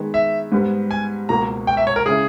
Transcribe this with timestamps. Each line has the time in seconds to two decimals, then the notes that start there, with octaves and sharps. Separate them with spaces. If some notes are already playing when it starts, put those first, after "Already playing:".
Already playing: D#3 G#3 B3
0.14 E5
0.52 G#2 G3 B3
0.91 G#5
1.29 C#2 B2 A#3 A#5
1.67 G5
1.77 E5
1.87 C#5
1.96 A#4
2.06 C#3 G#3 C#4 E4 G#4